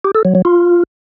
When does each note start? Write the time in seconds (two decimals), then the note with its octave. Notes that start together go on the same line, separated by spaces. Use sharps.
0.05 G4
0.15 A4
0.25 F#3
0.35 F#3
0.45 F4